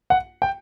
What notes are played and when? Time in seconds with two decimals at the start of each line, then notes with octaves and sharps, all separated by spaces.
0.10 F#5
0.42 G5